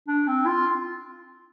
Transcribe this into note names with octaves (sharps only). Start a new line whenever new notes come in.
D4
C4
F4